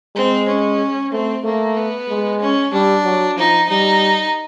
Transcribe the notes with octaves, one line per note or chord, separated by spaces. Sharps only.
G#3 C4
C#4
A3 C4
A3 A#3
B3
G#3
C#4
G3 D4
F#3
F3 D#4
G3 D#4